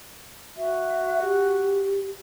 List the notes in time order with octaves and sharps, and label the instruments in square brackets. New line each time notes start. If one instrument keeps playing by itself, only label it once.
[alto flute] F#4 [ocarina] E5
[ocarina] G4